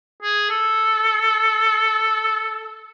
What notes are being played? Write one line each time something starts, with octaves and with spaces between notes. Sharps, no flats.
G#4
A4